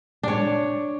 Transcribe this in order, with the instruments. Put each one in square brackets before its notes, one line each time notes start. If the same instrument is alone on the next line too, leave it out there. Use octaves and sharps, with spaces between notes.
[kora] D4 C#5